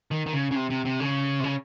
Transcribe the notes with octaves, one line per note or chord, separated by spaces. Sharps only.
D#3
D#3
C#3
C#3
C3
C3
C3
C#3
C3
C#3